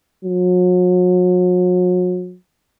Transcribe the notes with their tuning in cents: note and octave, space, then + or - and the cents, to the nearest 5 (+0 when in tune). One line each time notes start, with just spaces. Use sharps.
F#3 -40